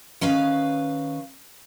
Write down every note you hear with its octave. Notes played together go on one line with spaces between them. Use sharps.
D#3 C#4 B4 F5